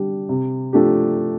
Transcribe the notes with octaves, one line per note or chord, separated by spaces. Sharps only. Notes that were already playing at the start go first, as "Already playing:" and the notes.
Already playing: D3 G3 D4 G4
C3
F3 A3 D4 G4